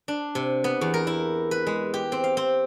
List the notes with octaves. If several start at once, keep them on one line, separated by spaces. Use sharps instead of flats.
D4
C3
B3
E2
A#4
E4
B4
G#3
G4
C4
F5
C4